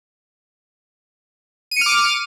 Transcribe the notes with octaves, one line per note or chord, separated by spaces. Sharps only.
D6 F6 C#7 D#7